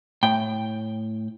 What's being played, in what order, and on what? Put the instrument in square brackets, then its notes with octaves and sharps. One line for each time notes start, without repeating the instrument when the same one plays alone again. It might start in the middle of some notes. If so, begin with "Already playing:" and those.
[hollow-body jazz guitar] A2 [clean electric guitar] G5